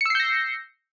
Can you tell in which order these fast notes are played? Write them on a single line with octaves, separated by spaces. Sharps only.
C#7 E6 C7 G6 A#6